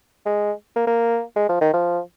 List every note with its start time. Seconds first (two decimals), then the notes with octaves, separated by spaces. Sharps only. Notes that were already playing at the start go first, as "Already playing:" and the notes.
0.26 G#3
0.76 A#3
0.87 A#3
1.36 G#3
1.49 F3
1.61 D#3
1.74 F3